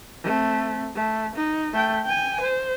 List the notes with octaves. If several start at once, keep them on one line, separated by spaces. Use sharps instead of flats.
A3 C4
A3
D#4
A3 G5
G5 G#5
C5